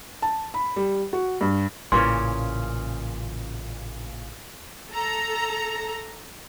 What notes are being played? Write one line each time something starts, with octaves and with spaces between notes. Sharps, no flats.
A5
B5
G3
F#4
G2
A1 A#2 C#3 E3 A#3 C#5 C6
A4 A#5